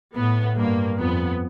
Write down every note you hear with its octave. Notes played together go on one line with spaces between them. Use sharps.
A2 B3
G2 A#3
F2 B3